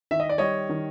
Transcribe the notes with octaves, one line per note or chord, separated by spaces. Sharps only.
D#3 E5
D#5
D5
G3 C#5 D#5
D#3